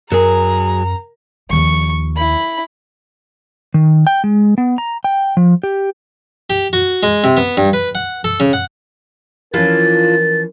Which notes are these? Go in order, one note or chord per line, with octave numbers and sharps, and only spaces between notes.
F#2 F#3 G#4 A#4 A#5
D#2 F3 C#6
E4 B5
D#3
G5
G#3
B3
A#5
G5
F3
G4
G4
F#4
G#3
C3
B3
G2
B4
F#5
A4
C#3
F#5
E3 F3 C#4 D4 E4 F4 A#4 A6